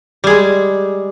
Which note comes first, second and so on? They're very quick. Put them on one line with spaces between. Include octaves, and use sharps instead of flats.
G3 G#4 G#3